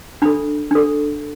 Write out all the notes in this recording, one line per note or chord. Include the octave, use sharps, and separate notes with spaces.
D4 A4 B5
D4 A4